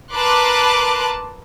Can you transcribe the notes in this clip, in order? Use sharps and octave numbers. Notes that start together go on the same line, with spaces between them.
A#4 B4 A5 C6 D6 F#6